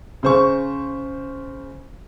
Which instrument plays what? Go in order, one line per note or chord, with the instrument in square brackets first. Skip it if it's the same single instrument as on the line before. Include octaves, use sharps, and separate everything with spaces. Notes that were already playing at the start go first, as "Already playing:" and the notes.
[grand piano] C#3 C5 C#6